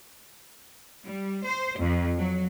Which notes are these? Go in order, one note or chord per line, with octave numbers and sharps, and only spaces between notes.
G3
C5
F2
F#3